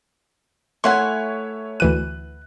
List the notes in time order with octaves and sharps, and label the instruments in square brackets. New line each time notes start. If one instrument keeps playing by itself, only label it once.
[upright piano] A3 C#5 [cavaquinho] E4 F#5 G#5 [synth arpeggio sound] C6
[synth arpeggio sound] D2 E3 D#7 [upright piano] F#6